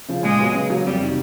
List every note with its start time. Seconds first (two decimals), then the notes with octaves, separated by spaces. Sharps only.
0.08 C#3 F3
0.23 A#2 G#3
0.39 F#3 B3
0.54 C#3
0.70 F#3 A#3
0.85 F2 G3
1.01 C3 D#3